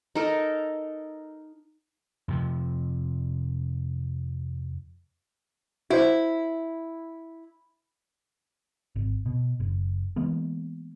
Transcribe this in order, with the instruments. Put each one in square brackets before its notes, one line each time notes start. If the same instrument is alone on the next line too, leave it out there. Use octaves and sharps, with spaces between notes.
[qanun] D#4 A4 A#4
[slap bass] F2 C3 F3
[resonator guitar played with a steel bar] E4 [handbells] F#4 C5
[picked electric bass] G#1
B2
F#1
E3 G#3 A#3 B3